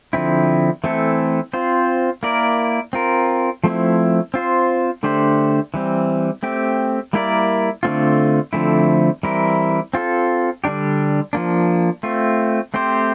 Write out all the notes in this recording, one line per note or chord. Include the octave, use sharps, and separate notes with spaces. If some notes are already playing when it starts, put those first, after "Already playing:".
D3 F3 C4 E4
E3 A3 C4 E4 A4
C4 F4 C5
A#3 E4 A#4 D5
C4 F4 A#4
F3 A3 C4 E4
C4 F4 C5
D3 A3 D4 G4 C5
E3 G3 C4
A3 C4 G4
G3 A#3 E4 A#4 D5
D3 A3 C4 F4
D3 F3 A3 C4 E4
E3 G3 C4 E4 A#4
C4 F4 A4
D3 G3 D4 G4
F3 A#3 D4
A3 C4 F4
A3 C4 G4 C5